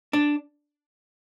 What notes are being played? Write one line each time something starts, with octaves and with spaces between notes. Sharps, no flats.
D4